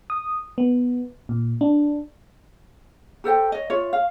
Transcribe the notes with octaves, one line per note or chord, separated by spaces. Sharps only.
D#6
B3
A#2
D4
G4 A4 C5 G5
C#5 D#5
F4 C#5 E5
F5